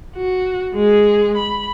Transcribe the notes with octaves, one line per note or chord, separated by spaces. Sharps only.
F#4
G#3 G#4
B5